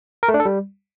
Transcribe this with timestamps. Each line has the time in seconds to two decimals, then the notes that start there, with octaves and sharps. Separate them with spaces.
0.23 A#4
0.28 A3
0.34 D4
0.40 A4
0.45 G3